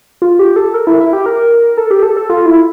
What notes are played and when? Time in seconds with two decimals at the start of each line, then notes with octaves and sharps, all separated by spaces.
0.22 F4
0.39 G4
0.56 A4
0.74 A#4
0.87 E4
1.00 E4
1.13 G4
1.26 A#4
1.77 A4
1.91 G4
2.03 A4
2.16 A4
2.30 F4
2.46 E4